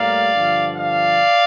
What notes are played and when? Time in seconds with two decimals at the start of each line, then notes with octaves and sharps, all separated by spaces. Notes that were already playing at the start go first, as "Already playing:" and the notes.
Already playing: A2 G3 A#3 D5 F5
0.31 G2 D3 F3
0.77 D5 F5